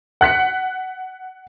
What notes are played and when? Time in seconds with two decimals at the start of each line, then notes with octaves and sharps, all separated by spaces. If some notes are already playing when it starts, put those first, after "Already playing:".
0.21 F#5 F#6 B6 C#7